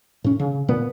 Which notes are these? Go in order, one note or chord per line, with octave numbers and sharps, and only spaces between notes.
A2 C#4
C#3
A#2 B3